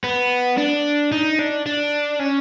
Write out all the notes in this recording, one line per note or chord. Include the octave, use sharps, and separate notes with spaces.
B3
D4
D#4
D4
D4
C#4